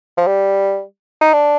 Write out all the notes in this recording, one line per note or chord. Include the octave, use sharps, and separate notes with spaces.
F3
G3
D#4
D4